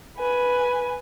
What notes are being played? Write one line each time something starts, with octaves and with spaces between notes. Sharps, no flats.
B4 G#5